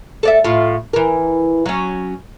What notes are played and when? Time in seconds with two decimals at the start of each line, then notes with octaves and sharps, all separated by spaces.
0.23 A4 D5 E5
0.44 A2 F4
0.93 E3 A#4
1.66 F#3 C#4